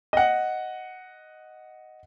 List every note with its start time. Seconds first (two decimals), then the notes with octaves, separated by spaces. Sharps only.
0.13 D#5 F#5